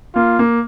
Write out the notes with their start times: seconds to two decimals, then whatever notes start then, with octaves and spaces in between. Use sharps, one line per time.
0.15 A#3 F4
0.39 A#3